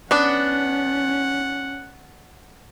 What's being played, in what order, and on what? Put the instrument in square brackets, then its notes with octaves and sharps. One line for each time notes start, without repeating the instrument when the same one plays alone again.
[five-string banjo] B3 D4 [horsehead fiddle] C#4 [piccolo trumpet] F#5